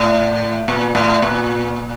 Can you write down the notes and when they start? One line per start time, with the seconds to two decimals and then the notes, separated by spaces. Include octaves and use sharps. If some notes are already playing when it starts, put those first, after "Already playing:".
Already playing: A2
0.68 A#2
0.95 A2
1.22 A#2